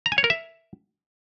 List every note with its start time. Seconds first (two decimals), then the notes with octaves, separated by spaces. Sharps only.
0.06 A#5
0.12 G#5
0.18 C#5
0.24 A#4
0.30 E5